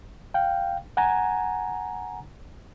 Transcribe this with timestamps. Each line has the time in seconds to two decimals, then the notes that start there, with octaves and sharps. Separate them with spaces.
0.34 F5 G5
0.97 F#5 G#5 A#5